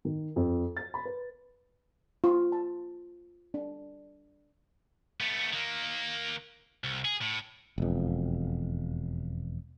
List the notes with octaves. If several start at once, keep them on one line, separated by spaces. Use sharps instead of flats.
D#3
F2
A6
B5
B4
F4
A5
D4
A3 B3
D#3 A#3
C2
G#4
A2
E1 F2